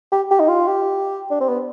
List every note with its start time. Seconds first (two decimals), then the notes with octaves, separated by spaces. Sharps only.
0.12 G4
0.31 G4
0.40 D#4
0.49 F4
0.68 G4
1.31 D4
1.41 C4
1.49 B3